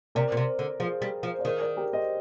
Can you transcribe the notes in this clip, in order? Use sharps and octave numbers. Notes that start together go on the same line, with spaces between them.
C3 A#4 D5
A#2
C3
D3
F3 G#4 C5
G3
F3
D5
D#3 G#4 C5
A#4 D5
G4 A#4
C5 D#5